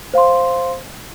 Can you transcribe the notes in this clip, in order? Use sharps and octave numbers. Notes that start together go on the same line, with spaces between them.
C5 F5 C6